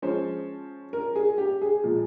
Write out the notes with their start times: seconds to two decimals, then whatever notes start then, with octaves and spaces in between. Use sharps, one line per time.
0.02 F3 G#3 C#4 C5
0.93 A#4
1.16 G#4
1.38 G4
1.62 G#4
1.84 A#2 F3 G#3